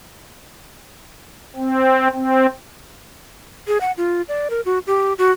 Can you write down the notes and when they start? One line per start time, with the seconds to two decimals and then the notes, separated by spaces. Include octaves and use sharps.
1.56 C4
2.13 C4
3.67 G#4
3.81 F#5
3.97 F4
4.28 D5
4.50 A#4
4.65 F#4
4.87 G4
5.18 F#4